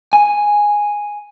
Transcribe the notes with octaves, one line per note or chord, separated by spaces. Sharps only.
G#5